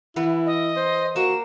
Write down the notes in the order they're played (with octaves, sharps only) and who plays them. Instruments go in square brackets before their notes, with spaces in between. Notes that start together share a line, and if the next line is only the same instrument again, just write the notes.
[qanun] E3 B3 [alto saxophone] E4
[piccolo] D#5
[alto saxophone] C5
[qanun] A#3 [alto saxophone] F#4 [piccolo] E7